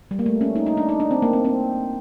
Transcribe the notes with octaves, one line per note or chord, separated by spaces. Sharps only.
G3
A#3
A3
C#4
D#4
D#4
D4
D#4
D4
C4
A#3
C4
C4